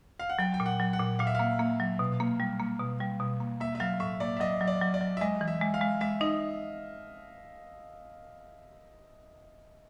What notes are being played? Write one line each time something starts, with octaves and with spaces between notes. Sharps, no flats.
F5
F#5
F#3 G5
G5
A#2
F#5
F#3
F#5
A#2
A#2 F5
E5
A#3 F5
A#3
F#3
B2
A#3
G3
A#3
B2
G3
B2
A#3
A#3 E5
E5
F#3 F5
A2 E5
A#3 D5
E5
F#3 D#5
F#3
D5
F#3
D5
F#3
E5
G#3 D#5
E3
E5
G#3
F5
G#3
G#3 E5
D#4 D#5